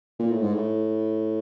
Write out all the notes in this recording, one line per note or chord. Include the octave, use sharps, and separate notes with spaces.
A#2
A2
G#2
A2